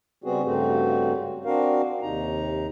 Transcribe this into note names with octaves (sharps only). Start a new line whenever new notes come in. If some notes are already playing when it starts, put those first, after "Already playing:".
C#3 G3 B3 C4 F#4 G#4
G2 C#3 A3 C4 F#4
C4 D4 F#4 A#4 F5
D#2 C3 D#4 A#5